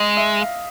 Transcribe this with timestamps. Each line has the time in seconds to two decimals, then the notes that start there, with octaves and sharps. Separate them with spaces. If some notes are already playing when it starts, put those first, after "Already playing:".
Already playing: G#3 D#5
0.17 E5
0.40 F5